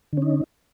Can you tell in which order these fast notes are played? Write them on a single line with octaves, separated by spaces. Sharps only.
D3 C#4 D#4